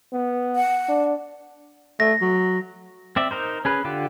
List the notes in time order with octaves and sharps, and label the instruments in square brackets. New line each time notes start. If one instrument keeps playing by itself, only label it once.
[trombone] B3
[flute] F#5
[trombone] D4
[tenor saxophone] A3 [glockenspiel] A#6
[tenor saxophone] F#3
[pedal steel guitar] C4 D5 E5
D#4 A#4 C5
C#4 G#4 B4
D3 F4 G4